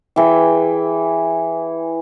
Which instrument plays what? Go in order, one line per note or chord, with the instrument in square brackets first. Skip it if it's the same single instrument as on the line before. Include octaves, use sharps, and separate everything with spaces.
[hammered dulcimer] E3 G#4 G5